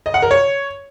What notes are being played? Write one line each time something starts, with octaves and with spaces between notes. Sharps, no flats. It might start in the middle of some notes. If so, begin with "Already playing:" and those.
D#5
F#5
A#4
C#5